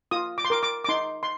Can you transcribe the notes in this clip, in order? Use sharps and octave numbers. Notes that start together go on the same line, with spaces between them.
F4 D#6
D6
C6
A#4 D6
D6
D6
D#4 C6
C6